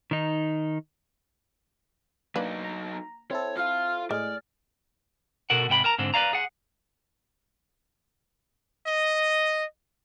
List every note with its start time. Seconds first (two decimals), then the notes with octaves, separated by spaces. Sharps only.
0.11 D#3 D#4
2.36 F#3 A#3 D4 D#4 B4
2.64 A#5
3.31 C4 E4 A4 C#5
3.57 F4 F5 F6
4.11 A2 G#3 G#4 D5 F6
5.50 B2 F#4 A4 A#4 F#5
5.69 G#2 C3 G5 B5
5.84 A#4 A5 A#5
5.99 G#2 D3 C4
6.14 B4 C5 D5 F5 A#5
6.33 G#4 F#5
8.86 D#5